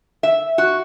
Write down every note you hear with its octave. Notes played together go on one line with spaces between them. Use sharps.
E5
F#4